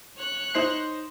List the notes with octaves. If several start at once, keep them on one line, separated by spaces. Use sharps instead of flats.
C#5 F#6
D#4 C5 C7